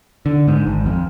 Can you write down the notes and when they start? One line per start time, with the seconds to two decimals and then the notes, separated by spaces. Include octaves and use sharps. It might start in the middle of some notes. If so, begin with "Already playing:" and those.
0.26 D3
0.48 G#2
0.66 G#1
0.86 F2